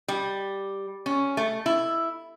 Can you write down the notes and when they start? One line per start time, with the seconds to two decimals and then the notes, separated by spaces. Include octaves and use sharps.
0.08 G3
1.06 C#4
1.37 A3
1.66 E4